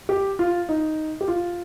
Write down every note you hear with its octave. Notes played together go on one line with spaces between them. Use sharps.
G4
F4
D#4
G4
F4